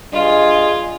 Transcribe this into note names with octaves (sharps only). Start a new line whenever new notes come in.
G2 F4 G#4 D#5